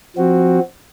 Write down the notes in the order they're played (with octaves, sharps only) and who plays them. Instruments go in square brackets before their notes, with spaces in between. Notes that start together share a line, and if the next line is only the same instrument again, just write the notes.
[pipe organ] F3 C4 F#4